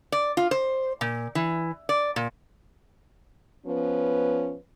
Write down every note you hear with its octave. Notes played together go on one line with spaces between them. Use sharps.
D5
F4
C5
A#2
E3
D5
A#2
F3 B3 C#4 B4